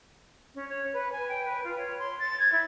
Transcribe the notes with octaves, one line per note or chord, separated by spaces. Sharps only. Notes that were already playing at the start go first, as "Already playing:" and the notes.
C#4
C#5
B4
G#5
G5
B4
F4
C#5
C6
A6
G#6
E4